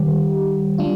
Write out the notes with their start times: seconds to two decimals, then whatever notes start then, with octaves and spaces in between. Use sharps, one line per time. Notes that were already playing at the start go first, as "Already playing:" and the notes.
Already playing: D#3 G3 G4
0.78 G3 D4 F4